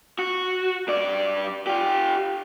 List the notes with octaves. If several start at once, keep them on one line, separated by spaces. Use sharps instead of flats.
F#4
G2 D5
F4 G4